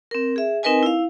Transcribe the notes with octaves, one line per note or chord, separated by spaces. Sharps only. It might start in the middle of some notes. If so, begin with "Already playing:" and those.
C4 A#4
G#4 E5
C4 D#4 A#4 B4 D#5 G#5
E4 F5